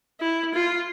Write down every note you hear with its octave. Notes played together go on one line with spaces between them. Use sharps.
E4
F4